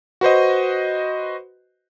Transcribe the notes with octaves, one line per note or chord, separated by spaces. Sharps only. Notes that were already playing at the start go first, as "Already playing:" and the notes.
F#4 B4 C5 D#5